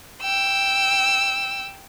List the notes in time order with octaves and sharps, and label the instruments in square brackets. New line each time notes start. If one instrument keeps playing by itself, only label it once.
[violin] G5 E6